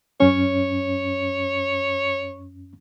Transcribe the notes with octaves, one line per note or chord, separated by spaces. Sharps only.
F#2 C#4 C#5